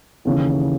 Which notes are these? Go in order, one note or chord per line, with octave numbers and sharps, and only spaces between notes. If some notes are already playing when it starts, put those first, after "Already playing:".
D#2 C#3 E3